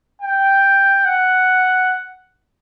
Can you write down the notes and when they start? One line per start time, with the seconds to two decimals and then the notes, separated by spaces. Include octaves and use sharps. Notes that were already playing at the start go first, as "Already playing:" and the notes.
0.22 G5
1.05 F#5